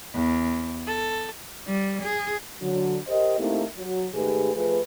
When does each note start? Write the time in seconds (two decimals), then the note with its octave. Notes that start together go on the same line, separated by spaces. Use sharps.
0.15 E2
0.86 A4
1.68 G3
2.03 G#4
2.62 D3 F#3
3.08 G4 A#4 C5 D#5
3.39 A3 A#3 C4 D#4 E4 G4
3.77 F#3
4.13 G#2 D#3 A3 G4 G#4 B4
4.54 F3 A3 G#4 B4